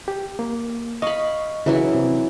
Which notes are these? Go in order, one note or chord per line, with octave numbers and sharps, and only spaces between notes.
G4
A#3
D#5 F5 B5 C#6
C#3 E3 F#3 E4
C3